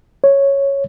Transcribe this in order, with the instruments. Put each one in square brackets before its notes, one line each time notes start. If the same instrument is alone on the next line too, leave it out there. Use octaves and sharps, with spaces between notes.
[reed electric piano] C#5